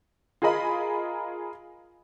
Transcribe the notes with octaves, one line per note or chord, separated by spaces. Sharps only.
F4 G#4 A#4 D#5 B5